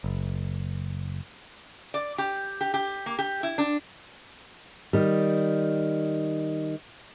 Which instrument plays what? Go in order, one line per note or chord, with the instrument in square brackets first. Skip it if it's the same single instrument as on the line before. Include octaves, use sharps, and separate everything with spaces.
[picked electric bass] F#1
[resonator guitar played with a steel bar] D5
G4
G4
G4
A#3
G4
E4
D4
[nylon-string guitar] D#3 G3